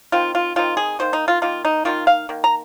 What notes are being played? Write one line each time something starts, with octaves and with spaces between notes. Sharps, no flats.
D#3 C4 D#4 F4
F4
D#3 C4 D#4 F4
G#4
D#3 A#3 D#4 C5
D#4
F4
D#3 A#3 D#4 F4
D#4
D#3 A#3 D#4 F4
F5
D#3 A#3
A#5